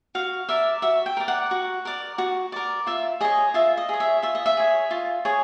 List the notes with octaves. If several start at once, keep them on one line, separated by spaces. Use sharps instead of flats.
F#4 F5
A#4 D5 E5
F#4 E5
G5
A#4 D5
F#5
F#4
A#4 D5
F#4
A#4 D5
F4 E5
G#4 C#5 D#5
F4 E5
D#5
G#4 C#5
E5
F4 E5
D#5
E5
G#4 C#5
F4
G#4 C#5